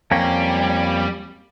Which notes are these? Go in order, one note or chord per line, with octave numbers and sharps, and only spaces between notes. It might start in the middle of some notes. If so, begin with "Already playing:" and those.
F2 G3 A#3 C#4 G5